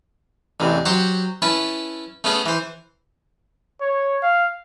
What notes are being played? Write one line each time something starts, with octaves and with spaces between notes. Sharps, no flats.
A1 E2 C3
F#3 F#4 G4 C5 F#5
C#4 E4 B4 A5
A3 B3 C#4 G#4 A4
E3 C5
C#5
F5